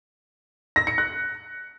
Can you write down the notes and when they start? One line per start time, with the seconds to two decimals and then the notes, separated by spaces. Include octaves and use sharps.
0.76 A#6
0.87 C#7
0.98 F#6